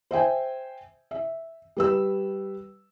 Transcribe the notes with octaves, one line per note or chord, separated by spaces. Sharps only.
C5 E5 G5 G#5
E5
G3 B4 E6